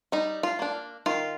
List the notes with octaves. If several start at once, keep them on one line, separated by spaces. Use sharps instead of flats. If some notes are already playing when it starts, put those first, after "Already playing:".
G3 D#4
F4
A#3 D4
D#3 F4